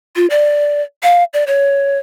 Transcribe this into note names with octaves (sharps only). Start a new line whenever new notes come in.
F4
D5
F5
D5
C#5